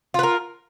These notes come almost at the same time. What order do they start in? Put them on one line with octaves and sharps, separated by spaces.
F4 B4 A#4